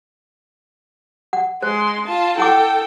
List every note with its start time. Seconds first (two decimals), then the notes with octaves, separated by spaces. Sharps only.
1.33 F#5
1.63 G#3 C5 C6
2.06 F4 A5
2.38 E4 A4 F#5 G5 D6